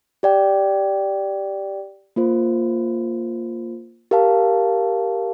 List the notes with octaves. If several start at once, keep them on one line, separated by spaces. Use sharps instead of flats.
G4 D5 G5
A#3 F4 C5
G4 A#4 F5 A5